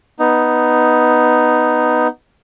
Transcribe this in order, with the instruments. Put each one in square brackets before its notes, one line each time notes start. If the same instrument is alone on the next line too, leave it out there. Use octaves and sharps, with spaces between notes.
[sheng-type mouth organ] B3 D#4